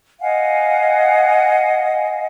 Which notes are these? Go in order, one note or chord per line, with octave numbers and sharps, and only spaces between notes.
D#5 F5 F#5 G#5